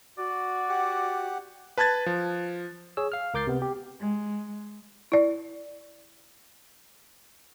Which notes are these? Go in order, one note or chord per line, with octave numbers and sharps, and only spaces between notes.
F#4 D5
G4 F#5
B4 A5 F#6 G#6 A6
F3
G#4 C#5 E6
F5 F6
C#2 A#4 D6 G6 A6 C7
C3 B3
G4
G#3
E4 D5